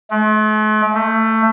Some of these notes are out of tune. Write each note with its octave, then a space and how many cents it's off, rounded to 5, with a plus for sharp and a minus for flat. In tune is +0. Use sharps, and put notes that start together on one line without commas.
A3 -45
A3 +20